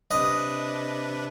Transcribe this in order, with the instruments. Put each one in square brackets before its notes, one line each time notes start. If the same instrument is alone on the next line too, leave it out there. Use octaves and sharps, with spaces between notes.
[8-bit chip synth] C3 D4 B4 [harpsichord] D#5